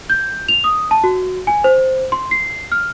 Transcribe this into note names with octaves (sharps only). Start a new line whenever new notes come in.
G6
F7
D#6
A5
F#4
G#5
C5
C6
C7
F6